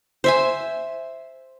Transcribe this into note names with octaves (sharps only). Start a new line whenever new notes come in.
C5 E5 G#5